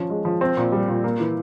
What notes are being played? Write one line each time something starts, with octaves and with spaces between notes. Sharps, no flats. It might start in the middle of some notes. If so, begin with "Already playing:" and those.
Already playing: F3 C#4
G#3
F3
C4
A#2
G3
A#2
A#3
E3